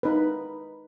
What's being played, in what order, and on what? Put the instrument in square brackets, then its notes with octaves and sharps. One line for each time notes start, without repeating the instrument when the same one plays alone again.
[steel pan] D#4 B4